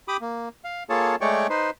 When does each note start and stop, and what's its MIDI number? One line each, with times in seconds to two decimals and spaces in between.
0.08 0.17 67
0.08 0.17 83
0.08 0.17 86
0.08 0.17 87
0.21 0.49 58
0.64 0.83 77
0.90 1.16 58
0.90 1.16 65
0.90 1.16 68
0.90 1.16 69
0.90 1.16 73
0.90 1.16 81
1.21 1.47 56
1.21 1.47 57
1.21 1.47 73
1.21 1.47 74
1.21 1.47 79
1.21 1.47 85
1.50 1.70 63
1.50 1.70 71
1.50 1.70 72